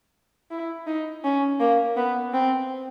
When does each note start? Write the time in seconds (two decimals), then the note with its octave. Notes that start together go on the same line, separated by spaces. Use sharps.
0.51 E4
0.87 D#4
1.24 C#4
1.60 A#3
1.97 B3
2.34 C4